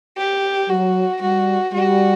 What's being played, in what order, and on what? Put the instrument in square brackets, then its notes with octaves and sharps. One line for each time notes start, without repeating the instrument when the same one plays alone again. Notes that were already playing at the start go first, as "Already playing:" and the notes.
[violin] G4
[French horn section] F#3 [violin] F#4
[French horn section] G3 [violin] F#4
[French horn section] G3 [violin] F#4